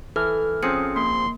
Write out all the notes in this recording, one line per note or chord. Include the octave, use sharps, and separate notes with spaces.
E3 A4 F6
F3 C4 C#4 G#4 D#6 C#7
A#3 C6